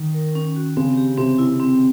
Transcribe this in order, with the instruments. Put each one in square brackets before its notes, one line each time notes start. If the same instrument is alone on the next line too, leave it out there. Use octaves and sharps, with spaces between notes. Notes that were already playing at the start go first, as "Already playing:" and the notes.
Already playing: [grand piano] D#3
[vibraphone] A#4
C#4
F#4
[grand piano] C#3 [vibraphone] C4
[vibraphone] G4
[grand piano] C3 [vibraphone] C4
[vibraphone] E4
C4